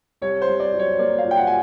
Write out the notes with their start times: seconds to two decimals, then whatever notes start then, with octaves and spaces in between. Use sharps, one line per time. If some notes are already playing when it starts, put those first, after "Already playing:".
0.22 C2 C#5
0.42 C5
0.47 C2
0.60 D5
0.74 F#3
0.79 C#5
0.99 A#3 D5
1.18 F5
1.25 A#2
1.31 G5
1.37 F#5
1.47 G#5